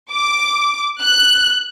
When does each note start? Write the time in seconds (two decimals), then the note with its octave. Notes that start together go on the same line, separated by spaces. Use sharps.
0.12 D6
1.02 F#6